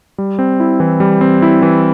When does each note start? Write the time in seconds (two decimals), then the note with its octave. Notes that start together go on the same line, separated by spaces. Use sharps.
0.18 G3
0.39 C4
0.60 E4
0.80 E3
1.00 G3
1.21 C4
1.42 E4
1.62 E3